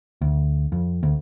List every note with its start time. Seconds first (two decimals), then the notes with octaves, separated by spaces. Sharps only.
0.21 D2
0.72 F2
1.03 D2